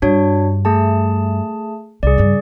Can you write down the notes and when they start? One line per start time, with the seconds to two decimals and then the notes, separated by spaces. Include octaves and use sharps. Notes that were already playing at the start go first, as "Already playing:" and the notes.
0.02 G2 D4 F#4 C#5
0.65 A3 G#4 A5
2.03 C2 G#4 D5
2.18 G2 C#3